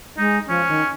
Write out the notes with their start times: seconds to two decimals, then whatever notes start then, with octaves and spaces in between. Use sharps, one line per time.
0.17 G#3 D#4
0.48 F3 C#4
0.68 D#3